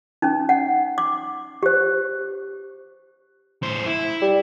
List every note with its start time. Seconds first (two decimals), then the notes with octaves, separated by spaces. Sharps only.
0.22 C#4 D#4
0.49 F#5
0.98 D6
1.63 G4 C5
3.63 A2 C5
3.86 E4
4.22 G3